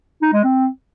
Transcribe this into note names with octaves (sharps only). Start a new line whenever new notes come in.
D#4
G#3
C4